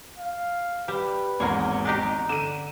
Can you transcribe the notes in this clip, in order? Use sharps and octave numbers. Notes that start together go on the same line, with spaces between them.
F5
G3 G4 B4
G#1 E2 G#2 A#3 G#4 C#5
D4 D#4 G4 A#5
D3 D#7 E7